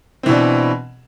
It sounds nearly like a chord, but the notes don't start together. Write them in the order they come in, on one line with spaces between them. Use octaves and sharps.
C4 E3 B2 D4